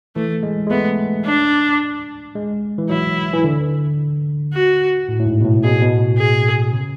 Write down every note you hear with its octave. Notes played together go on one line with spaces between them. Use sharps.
E3 A3
G#3
G#3
A3 B3
D4
G#3
E3
F#3 E4
E3
D3
F#4
A2
A2
G#2
B2
A2
B2 G#4
A2
B2
G#4
C#3